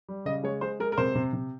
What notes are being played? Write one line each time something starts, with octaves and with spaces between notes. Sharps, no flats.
G3
C#3 D#5
G#3 C#5
G#3 C5
G#3 A#4
A#4
C3 C5
C3
C3